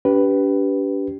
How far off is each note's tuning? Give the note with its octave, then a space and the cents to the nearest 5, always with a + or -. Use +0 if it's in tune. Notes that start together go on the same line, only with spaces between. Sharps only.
D4 -45 G4 -15 B4 +0